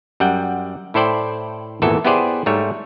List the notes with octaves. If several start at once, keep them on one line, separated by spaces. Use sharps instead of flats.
F#2 G3 F#5 G5
A2 E4 A4 C5 D5 G5
G#1 E2 A#2 E3 A4 E5
B3 E4 G4 G#4 C5 D5
G#2 G3 A3 C#5